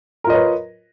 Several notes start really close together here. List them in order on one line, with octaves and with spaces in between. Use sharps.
A#4 F4 D#5 C#5 B4